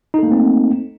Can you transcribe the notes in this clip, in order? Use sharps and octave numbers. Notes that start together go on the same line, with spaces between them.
A3 A#3 C4 D#4 A4